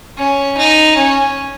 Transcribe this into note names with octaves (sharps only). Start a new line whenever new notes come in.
C#4
D#4
C#4